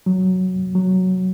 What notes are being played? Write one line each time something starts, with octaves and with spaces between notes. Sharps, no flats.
F#3
F#3